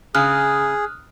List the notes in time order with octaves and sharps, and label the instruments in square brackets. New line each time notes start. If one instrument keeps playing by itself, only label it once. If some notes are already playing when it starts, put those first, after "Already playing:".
[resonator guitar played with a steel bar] C#3 [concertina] G#4 [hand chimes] D#6 F6 F#6